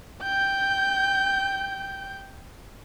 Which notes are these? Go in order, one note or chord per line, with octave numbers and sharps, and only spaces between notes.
G5 G6